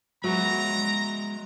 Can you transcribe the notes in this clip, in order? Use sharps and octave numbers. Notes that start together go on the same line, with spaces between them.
F#3 G#3 B4 E5 A#5